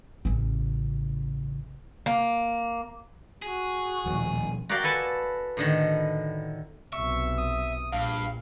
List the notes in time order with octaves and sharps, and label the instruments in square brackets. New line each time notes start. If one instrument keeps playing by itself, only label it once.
[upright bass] A1 C#3
[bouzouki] A#3
[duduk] F#4 [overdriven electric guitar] G#4
[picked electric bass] D#1 [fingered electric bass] B2 F3
[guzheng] F#4 G4 A#4 D5 F5 G5
A4 B4 G#5 A5
A2 D3 D#3
[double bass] B1 C3 [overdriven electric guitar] E5 [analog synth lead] C#6
[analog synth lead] D#6
[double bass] A#1 [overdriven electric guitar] G2 [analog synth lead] F5